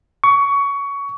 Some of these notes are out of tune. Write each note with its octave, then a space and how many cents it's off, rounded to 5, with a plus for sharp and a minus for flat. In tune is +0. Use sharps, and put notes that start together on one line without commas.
C#6 +20